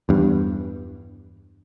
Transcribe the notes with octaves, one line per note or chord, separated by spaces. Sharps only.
E2 G2